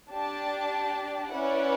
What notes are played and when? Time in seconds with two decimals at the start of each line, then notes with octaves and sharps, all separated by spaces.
0.11 D4 G4 D5 A5
1.31 C#4 E4 B4 D5 F#5